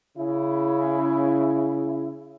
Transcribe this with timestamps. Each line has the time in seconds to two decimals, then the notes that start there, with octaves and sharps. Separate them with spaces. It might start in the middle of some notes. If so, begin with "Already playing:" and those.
0.17 C#3 E4